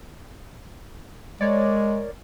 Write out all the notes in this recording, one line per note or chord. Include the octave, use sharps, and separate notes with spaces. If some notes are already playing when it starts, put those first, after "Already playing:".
G#3 A#4 C#5 D5